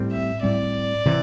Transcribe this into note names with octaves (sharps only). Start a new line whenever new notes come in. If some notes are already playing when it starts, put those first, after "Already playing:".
Already playing: A2 G3 C4
E5
A2 G3 C4 D5
C3 E3